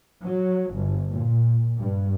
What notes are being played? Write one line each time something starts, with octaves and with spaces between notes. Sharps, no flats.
F#3
G1
A#2
G2